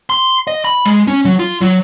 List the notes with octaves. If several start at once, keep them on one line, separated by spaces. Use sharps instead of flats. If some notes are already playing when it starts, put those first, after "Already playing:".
C6
D#5
B5
G#3
C#4
F#3
F4
F#3